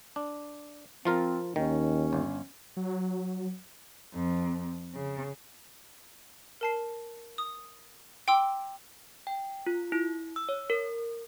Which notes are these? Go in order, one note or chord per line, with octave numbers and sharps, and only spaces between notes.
D4
F3 C4 F4 A#4
D#2 D#3 C#4
G1
F#3
F2
C#3
A#4 A5 C7
D#6
G5 C6 D6 E6
G5
F4
E4
E6
C#5
A#4